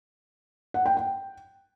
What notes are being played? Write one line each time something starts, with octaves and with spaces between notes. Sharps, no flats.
F#5
G5
G5